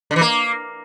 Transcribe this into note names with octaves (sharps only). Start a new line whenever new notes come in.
D3
E3
A#3